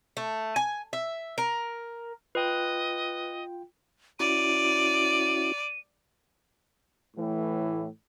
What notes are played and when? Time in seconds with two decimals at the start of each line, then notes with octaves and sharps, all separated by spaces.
0.17 A3
0.56 G#5
0.93 E5
1.38 A#4
2.35 F4 B4 D#5 G5
4.20 C#4 E4 F#4 D5 D#7
7.15 A2 E3